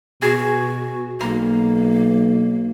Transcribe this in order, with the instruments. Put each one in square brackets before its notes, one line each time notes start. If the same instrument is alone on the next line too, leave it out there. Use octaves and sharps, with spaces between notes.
[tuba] B2 [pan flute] F#4 [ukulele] G#4
[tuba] B1 [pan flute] A#3 [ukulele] A#4